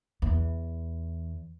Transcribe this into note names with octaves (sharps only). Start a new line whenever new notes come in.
E2